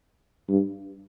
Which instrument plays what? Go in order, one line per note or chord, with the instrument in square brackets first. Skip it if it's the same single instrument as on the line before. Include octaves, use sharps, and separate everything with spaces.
[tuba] G2